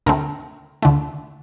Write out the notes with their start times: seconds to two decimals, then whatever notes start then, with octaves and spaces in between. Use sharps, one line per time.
0.06 D2 D3 A3 C4 A#4
0.82 D2 D3 A3